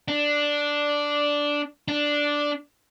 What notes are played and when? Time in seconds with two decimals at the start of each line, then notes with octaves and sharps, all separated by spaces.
0.08 D4
1.88 D4